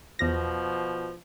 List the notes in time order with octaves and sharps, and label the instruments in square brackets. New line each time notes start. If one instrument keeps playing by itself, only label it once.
[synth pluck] E2 A#6 [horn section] B2 F3